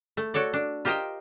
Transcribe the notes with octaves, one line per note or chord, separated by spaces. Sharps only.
A3
F#4 A4 C#5 D5
D4
F4 G4 A#4 C5 D#5 G5